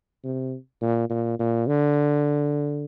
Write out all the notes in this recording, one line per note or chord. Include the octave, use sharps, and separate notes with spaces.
C3
A#2
A#2
A#2
D3